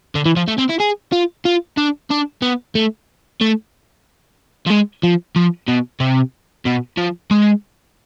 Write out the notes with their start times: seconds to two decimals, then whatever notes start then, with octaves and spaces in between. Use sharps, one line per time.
0.15 D3
0.26 E3
0.36 F3
0.48 A3
0.58 C4
0.69 E4
0.80 G#4
1.12 F4
1.45 F4
1.78 D4
2.11 D4
2.42 B3
2.75 A3
3.41 A3
4.66 F3
4.70 G#3
5.03 F3
5.36 F3
5.68 B2
6.00 C3
6.65 B2
6.97 F3
7.31 G#3